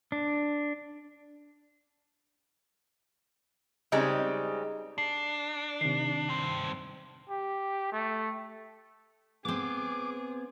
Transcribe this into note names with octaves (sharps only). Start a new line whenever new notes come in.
D4
C#3 G3 G#3 C4 D#4
D4 C7
C3 D#3 C7
G2 C4
G4
A3
B3 C4 G#4 D6